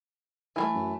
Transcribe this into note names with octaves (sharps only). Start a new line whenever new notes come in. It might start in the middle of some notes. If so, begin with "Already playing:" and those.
E3 G#3 A3
F#2